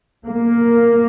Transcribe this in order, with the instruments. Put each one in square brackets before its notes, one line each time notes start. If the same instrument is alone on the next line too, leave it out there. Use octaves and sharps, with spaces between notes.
[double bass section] A#3